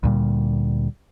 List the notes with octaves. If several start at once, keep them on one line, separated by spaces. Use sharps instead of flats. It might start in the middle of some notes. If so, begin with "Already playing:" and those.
D2 A#2 G3